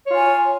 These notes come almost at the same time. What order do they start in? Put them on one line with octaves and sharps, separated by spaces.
C#5 F4 G#5